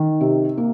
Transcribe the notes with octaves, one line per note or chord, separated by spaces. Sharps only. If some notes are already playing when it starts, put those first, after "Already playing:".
Already playing: D#3
C3
A#3